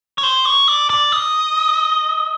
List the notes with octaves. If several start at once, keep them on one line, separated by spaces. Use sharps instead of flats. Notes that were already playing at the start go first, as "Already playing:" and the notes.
C#5
C5
C#5
D5
D5
D#5